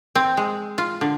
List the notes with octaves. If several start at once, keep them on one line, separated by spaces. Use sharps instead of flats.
C4
G#3
F4
D3